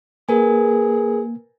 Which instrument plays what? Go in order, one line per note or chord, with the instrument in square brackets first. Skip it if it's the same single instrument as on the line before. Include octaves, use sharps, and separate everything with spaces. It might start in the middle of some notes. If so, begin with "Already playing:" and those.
[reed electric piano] A#3 [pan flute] G#4 [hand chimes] A#4 B4 G#5